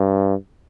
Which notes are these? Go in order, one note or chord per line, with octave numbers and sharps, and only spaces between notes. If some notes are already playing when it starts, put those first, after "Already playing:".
Already playing: G2